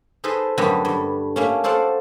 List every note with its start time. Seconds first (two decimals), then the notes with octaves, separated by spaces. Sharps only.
0.24 D#4 G#4 A4 B4 C5
0.57 F#2 D3 G3 A3 B3 F#4
0.85 G2
1.36 A3 A#3 C#4
1.64 D4 A4 C5 D5 F5 F#5